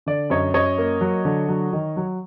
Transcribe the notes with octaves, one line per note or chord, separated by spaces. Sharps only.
D3 D5
F#2 C#5 D#5
F#2 C#5 D#5
A#3
F#3
D3
F#3
D#3
F#3